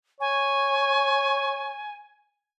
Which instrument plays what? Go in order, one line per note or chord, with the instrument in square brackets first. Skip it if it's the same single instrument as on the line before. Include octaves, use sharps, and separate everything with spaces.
[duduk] C#5 [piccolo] G#5